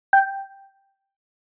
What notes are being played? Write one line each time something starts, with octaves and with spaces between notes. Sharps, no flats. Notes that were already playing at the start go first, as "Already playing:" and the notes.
G5